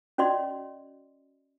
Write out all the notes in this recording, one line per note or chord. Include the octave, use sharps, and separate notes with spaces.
C#4 F#4 D5 D#5 C6